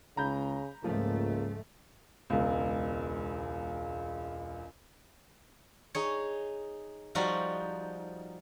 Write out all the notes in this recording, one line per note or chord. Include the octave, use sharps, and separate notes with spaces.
C#2 C#3 A#5 B5 G6
C#2 G#2 F3 A3 A#3
E1 C#2
D#4 G#4 C#5
F3 G3 D#4 F#4 C5